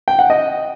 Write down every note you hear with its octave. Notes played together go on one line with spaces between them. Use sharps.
G5
F#5
D#5